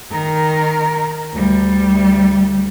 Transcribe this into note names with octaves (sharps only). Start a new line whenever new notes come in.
D#3 A#4
D2 G3